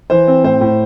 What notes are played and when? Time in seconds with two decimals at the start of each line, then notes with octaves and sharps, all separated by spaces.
0.10 E3 C5
0.28 C4
0.44 A2 C5
0.61 A2